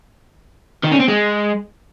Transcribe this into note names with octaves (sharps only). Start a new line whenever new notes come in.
D#3
C#4
C4
G#3